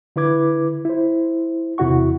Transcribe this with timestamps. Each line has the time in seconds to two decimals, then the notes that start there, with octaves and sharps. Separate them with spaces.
0.16 D3 E4 B4 D6 G#6
0.85 E4 C5
1.78 E2 C3 E4 F#4 F#5 C#6